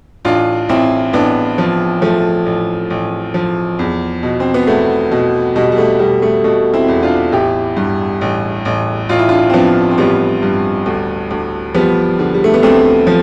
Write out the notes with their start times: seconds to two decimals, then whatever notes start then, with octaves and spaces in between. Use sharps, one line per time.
0.25 A1 D4 F4
0.69 A1 C4 E4
1.13 A1 B3 D4
1.58 F3
2.02 F3 A3
2.46 A1
2.90 A1
3.34 F3
3.79 E2
4.23 B2
4.40 C4
4.54 B3
4.67 E2 A3
5.11 B2
5.55 B2 G3
5.72 G3
5.78 A3
5.99 B2 G3
6.22 A3
6.44 B2 A3
6.74 C4 E4
6.88 E2
7.03 D4 F4
7.32 A1 E4 G4
7.77 G2
8.21 A1
8.65 A1
9.09 A1 F4
9.19 E4
9.29 D4 F4
9.50 C4
9.54 F3 B3 D4
9.91 C4
9.98 A1 G3 B3
10.43 G2
10.86 D2
11.31 D2
11.74 F3 G3 B3
12.19 D3
12.34 G3
12.44 A3
12.54 B3
12.63 D2 A3 C4
13.07 F3